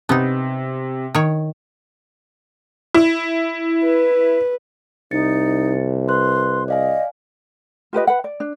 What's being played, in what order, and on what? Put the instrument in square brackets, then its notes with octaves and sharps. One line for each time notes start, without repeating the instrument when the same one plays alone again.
[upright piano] C3 [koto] B3 D#4
[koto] D#3 C#5
[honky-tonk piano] E4
[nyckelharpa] B4
[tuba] C2 [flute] D#4 [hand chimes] A6 C#7
[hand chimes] B4 F#6 [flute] C6
[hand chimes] D5 F5 G#5 [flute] D#5
[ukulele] F4 G4 B4 D#5
B4 F#5
D5
D4